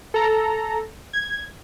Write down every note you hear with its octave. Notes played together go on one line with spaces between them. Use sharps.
A4 A#5
G#6